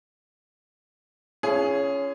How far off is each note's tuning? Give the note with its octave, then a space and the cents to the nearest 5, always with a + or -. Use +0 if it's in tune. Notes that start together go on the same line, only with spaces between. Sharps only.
C#4 +10 F4 -40 G#4 +0